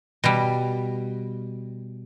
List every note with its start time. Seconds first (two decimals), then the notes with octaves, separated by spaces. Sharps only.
0.24 B2 G3